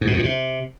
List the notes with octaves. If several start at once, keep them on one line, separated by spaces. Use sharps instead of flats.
G#2
B2
F2
A#2
C3